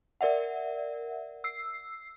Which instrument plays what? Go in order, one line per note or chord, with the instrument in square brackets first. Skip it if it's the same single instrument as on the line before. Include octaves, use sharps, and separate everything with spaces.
[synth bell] A#4 D5 E5 F#5
E6 C7